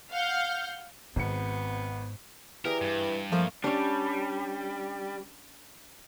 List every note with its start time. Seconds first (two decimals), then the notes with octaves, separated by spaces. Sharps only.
0.13 F5 F#5 F6 G6
1.16 G#1 G#2 B3 C4 C#7
2.65 E3 G4 G#4 A#4 D5
2.81 G2
3.32 F3 A3 A#3 A#4
3.64 G3 C#4 D4